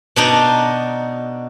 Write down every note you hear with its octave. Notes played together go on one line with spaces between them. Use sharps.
B2 D4 D#4